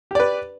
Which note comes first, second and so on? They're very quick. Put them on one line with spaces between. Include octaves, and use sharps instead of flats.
G4 D5 B4